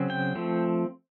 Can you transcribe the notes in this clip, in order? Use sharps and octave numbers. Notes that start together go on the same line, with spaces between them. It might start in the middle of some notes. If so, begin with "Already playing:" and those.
Already playing: C#3 F#3 C4
G5
F3 A3 C4